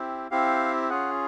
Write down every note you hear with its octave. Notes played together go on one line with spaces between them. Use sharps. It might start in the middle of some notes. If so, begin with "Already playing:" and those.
Already playing: C4 E4 G4
C4 E4 G4 F5
C#4 F4 G#4 F#5